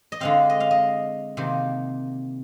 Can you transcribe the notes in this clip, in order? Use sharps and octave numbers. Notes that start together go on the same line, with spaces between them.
D#5
D3 G#3 C4 F5
D#5
F5
D#5
C3 D#3 A#3